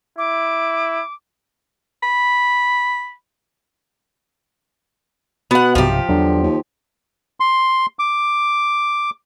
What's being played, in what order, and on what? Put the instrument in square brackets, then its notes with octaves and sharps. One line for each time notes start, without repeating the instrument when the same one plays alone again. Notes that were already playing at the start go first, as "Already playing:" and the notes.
[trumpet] E4 [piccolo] D6
[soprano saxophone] B5
[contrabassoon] B2 [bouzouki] B3 F#5
[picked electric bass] B1 G2 C3 [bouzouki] F3 G4
[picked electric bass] E2 F#3 [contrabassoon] D3
[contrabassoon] D#2
[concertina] C6
D6